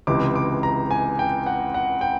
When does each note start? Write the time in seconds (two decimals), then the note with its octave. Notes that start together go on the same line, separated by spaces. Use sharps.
0.07 C#2 C3 E3 G#3 D6
0.35 D6
0.63 A#5
0.91 G#5
1.19 G5
1.46 F#5
1.74 F#5
2.01 G5